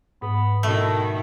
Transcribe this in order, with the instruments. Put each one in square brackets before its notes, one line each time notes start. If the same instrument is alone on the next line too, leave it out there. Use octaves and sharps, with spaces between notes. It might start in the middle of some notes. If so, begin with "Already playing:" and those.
[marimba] G#2 [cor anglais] B3
[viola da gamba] B2 D#3 E4 [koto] A3 [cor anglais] A4